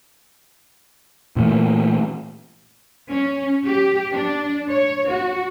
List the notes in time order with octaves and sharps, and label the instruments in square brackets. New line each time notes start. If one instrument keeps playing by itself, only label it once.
[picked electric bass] A#2 E3 A3
[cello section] C#4
G4
D4
C#5
F#4